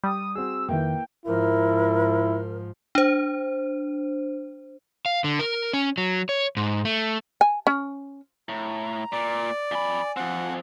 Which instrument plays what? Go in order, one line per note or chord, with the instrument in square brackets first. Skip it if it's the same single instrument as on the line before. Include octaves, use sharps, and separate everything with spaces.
[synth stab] G3 [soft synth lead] D#6
[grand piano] C4 F#4 G#4 [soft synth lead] E6
[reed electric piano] F2 D#3 [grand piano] A#3 E4 B4 [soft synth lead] G5
[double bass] G#2 F3 [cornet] E4 [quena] A#4
[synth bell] D4 C5
[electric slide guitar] F5
D3
A#4
C#4
F#3
C#5
G#2
A3
[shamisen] G#5
C#4
[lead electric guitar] A2 [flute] A#5
[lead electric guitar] A#2 [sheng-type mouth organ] D5
[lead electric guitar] F2 B5 [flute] G#5
[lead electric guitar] F3 C4 [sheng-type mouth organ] F#5